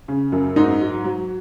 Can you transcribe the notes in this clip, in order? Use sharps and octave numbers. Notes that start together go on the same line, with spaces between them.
C#3
F#2
G#2 D#4
F#3
F#3